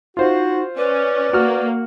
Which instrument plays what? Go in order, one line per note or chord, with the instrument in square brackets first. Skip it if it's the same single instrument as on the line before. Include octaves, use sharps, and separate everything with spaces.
[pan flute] D#4 [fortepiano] F4 C5 [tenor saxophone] F#4
[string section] C#4 [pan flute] B4 [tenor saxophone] D5
[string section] A#3 [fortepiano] F#4 F6